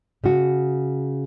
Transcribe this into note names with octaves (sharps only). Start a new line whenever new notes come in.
C#3 F#4